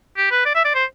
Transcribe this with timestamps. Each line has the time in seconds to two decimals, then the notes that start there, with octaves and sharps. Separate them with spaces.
0.17 G4
0.31 B4
0.45 D5
0.55 E5
0.65 D5
0.75 C5